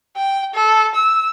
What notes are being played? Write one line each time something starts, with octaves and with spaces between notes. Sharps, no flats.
G5
A4
E6